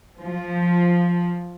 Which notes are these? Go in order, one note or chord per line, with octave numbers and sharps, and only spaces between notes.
F3